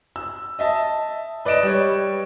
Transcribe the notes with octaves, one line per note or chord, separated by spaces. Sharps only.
E6
D#5 E5 A5
B4 D5 D#5 D7 E7
G3 C#5